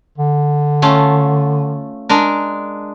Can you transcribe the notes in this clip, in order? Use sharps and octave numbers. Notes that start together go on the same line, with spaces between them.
D3
A3 C#4 F4
G#3 D4 A#4